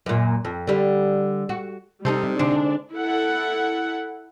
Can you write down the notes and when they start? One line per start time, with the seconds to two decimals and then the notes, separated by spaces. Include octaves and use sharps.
0.06 F#2 A#2
0.45 F2
0.67 D3 G3
1.49 F#4
2.05 C3 G3 D#4 A4 C5
2.39 D3 G#3 C4 D4
2.93 E4 A4 F#5